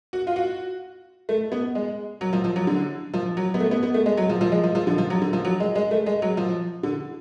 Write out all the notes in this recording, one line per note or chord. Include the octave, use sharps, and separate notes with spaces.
F#4
F4
F#4
A3
B3
G#3
F#3
F3
F3
F#3
D3
F3
F#3
B3
A3
B3
B3
A3
G#3
F#3
F3
F3
G#3
F3
F3
D3
F3
F#3
D3
F3
F#3
G#3
G#3
A3
G#3
F#3
F3
D3